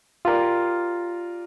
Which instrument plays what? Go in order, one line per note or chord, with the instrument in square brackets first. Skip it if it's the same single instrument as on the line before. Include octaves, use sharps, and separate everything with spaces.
[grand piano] F4 G4 A#4 D5